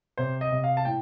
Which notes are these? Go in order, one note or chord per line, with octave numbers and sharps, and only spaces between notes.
C3 C5
D#5
C3
F5
A5
A2 G5